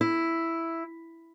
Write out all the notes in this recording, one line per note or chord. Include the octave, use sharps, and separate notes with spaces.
E4